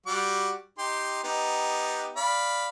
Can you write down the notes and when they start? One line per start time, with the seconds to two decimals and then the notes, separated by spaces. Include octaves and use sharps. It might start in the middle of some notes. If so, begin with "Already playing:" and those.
0.06 G3 F#4 D6
0.78 D#4 G4 C6
1.24 B3 D#4 G4
2.16 D5 F5 B5